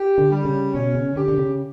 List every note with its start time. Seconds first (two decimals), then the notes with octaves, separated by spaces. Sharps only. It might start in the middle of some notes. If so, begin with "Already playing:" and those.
Already playing: G4
0.18 D3
0.32 G3
0.45 C#3
0.74 B2 C#4
0.95 C#3
1.16 D3 G4
1.28 D3
1.38 C#3